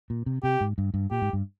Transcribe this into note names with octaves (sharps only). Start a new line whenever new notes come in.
A#2
C3
C3 G4
G#2
G2
G2
A#2 G4
G#2
G2